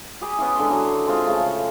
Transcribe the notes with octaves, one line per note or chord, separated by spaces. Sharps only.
G4 G#4 B5
B3 C#4 E4
D3 G#3 C6
F#3
G#3 C4 F4
C#3 A3